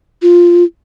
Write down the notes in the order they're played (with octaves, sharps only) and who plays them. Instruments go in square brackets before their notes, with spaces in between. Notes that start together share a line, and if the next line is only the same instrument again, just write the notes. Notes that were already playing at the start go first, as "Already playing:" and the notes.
[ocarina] F4